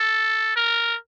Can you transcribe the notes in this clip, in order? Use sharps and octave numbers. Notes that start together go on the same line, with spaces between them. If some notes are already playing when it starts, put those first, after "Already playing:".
Already playing: A4
A#4